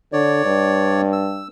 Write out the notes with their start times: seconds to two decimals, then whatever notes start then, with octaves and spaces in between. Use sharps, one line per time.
0.13 D3 C#5 D5
0.45 G2
1.12 E6